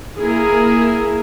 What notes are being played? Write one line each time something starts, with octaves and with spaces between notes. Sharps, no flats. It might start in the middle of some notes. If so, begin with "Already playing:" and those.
A#3 E4 G#4 A#4